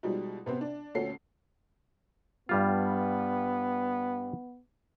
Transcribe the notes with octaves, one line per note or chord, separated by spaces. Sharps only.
B2 F3 G3 G#3 D#4
C3 B3 C4
D4
D2 A#2 C#4 A4 C7
G2 G3 B3 F4